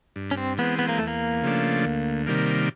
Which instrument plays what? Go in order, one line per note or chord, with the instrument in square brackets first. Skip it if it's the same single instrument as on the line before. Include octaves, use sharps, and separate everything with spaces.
[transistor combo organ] G2
[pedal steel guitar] C#4
C4
[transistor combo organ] E3 G#3 C4 [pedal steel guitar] B3
[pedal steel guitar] B3
A#3
[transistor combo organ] E2 [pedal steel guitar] A3
[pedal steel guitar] A#3
[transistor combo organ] C#3 F3 A3 D4
D2
C3 D#3 G3 A#3